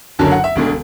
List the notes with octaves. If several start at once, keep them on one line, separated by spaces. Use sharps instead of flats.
F#1 F#2 D3 F#3 A5
F#5
E5
E1 D2 D3